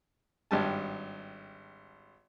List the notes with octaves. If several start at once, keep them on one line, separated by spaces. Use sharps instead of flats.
G#1 G2 A5